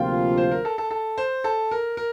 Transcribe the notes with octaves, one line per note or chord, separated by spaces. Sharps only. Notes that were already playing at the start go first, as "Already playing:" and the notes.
Already playing: D2 C3 F3 A#3 F4 G5
C5
A#4
A4
A4
A4
C5
A4
A#4
A#4